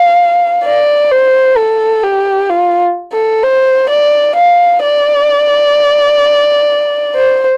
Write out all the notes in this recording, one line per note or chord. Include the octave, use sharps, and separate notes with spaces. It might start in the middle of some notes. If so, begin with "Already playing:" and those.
Already playing: F5
D5
C5
A4
G4
F4
A4
C5
D5
F5
D5
C5